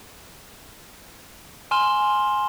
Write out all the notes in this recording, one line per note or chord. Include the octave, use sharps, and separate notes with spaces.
G#5 C6 F6 E7 G7